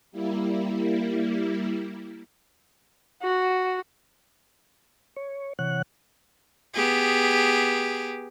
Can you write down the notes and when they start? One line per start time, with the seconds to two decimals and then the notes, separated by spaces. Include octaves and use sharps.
0.12 G3 A#3 E4
3.23 F#4
5.16 C#5
5.59 C3 E3 C#5 F#5 F#6
6.74 B3 G4 G#4